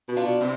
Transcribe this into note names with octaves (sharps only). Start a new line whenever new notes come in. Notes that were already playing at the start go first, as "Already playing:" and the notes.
B2
D4 F4
B2
C3 C4 E4